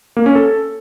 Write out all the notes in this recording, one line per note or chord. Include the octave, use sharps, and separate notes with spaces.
A#3
C#4
A4